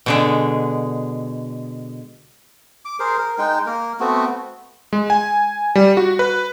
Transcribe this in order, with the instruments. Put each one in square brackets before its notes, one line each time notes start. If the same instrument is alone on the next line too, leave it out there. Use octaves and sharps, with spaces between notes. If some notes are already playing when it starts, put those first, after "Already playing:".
[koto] B2 D3 G#3
[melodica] D6
G#4 A#4 C5
A#4
G#3 D#4 G5
A#3 A#4
A3 B3 C4 F#4
[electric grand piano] G#3
G#5
G3
F#4
B4